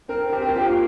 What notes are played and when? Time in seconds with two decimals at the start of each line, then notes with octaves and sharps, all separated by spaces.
0.09 C4 A#4
0.32 C4 G4
0.42 A#4
0.49 G4
0.56 F4
0.67 A#3